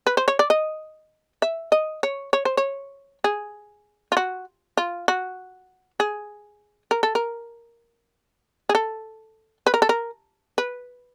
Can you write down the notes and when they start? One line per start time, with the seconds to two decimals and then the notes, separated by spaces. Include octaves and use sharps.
0.07 B4
0.17 C5
0.28 C#5
0.39 D5
0.50 D#5
1.42 E5
1.72 D#5
2.03 C#5
2.33 C#5
2.45 C5
2.57 C#5
3.24 G#4
4.12 F4
4.17 F#4
4.77 F4
5.08 F#4
6.00 G#4
6.91 A#4
7.03 A4
7.15 A#4
8.69 G#4
8.75 A4
9.67 B4
9.74 A#4
9.82 A4
9.89 A#4
10.58 B4